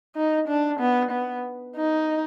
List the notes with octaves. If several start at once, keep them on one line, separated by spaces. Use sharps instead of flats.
D#4
D4
B3
B3
D#4